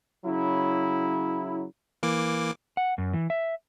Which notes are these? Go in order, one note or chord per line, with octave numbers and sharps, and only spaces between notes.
C#3 F#3 E4
E3 A#3 D6
F#5
F#2
E3
E5